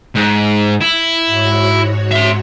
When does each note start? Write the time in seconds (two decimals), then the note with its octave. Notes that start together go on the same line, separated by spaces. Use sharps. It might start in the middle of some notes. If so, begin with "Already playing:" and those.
0.15 G#2
0.81 E4
1.27 G#2 F#4 C#5
2.11 E5 C6